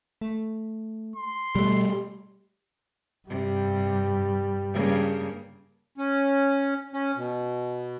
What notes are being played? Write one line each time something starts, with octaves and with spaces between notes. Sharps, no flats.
A3
C6
B2 G3 A3
G2 C3 G3
G2 C#3 A#3
C#4
C#4
B2